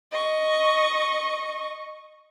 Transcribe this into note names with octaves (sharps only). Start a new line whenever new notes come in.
D#5 C#6